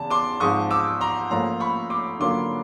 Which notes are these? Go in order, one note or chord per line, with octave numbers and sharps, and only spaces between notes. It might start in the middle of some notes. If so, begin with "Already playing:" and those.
Already playing: E2 C#3 E3 A5
C6 D6
G#2 F3 G#3 C4 C#6 D#6
D6 E6
A#5 C6
A2 F3 A#3 C#4 A#5 C6
B5 C#6
C6 D6
D3 F#3 A#3 C#4 F4 C6 D6